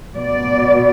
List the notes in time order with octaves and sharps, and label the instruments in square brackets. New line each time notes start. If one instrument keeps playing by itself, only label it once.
[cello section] B2 D5